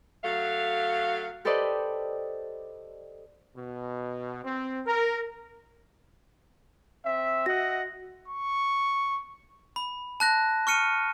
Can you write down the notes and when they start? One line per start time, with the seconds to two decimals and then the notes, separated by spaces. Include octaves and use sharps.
0.24 F#3 A3 F5
1.45 G4 A4 B4 C5 D5 D#5
3.56 B2
4.44 C4
4.86 A#4
7.04 C4 E5
7.46 F#4 D#5 E5 F#5 A#6
8.28 C#6
9.76 B5
10.20 A5 F#6 A#6
10.67 C#6 F6 C#7 D#7